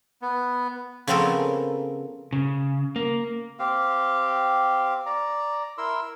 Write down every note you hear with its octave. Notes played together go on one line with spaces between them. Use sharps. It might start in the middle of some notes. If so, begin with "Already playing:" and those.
B3
C#3 F3 B3 C4 A4 A#4
C#3
A#3
C4 G4 F5
D5 A#5
E4 A#4 C6 E6